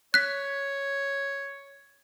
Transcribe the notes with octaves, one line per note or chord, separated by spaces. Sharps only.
C#5 F#6 B6